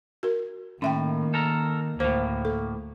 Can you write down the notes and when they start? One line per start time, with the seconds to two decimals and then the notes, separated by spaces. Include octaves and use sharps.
0.23 F#4 A#4
0.82 A2 D#3 A#3 C#4 E5 G5
1.34 A4 A#4
2.00 D2 A2 A#3 C5
2.45 A4